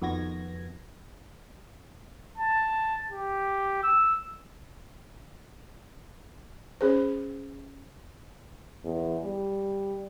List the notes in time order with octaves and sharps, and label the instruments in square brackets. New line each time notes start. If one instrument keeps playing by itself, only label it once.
[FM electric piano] F2 D#3 B3 F#4 G#6 A#6
[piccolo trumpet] A5
G4
E6
[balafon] C#4 G#4 C5
[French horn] E2
G3